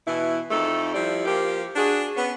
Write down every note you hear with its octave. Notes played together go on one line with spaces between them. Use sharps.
B2 E3 E4
F2 A3 D#4 A4
F3 G3 E4 D5
F3 A#3 G4
D4 F#4 G#4
B3 C#4